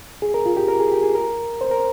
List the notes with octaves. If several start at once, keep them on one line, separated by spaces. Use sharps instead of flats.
G#4
A#4
F4
G4
A#4
G#4
G4
G#4
A#4
C5
A#4